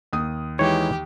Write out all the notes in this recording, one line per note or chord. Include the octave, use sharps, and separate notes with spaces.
D#2 D#6
E3 G#3 D#4 G4 C#5